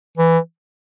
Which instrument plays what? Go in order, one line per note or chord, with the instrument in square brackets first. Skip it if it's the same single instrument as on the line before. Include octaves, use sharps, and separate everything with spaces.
[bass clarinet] E3